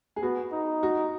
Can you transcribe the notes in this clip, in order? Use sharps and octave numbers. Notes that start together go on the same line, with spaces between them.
G#4
B3 F#4
D#4
F#4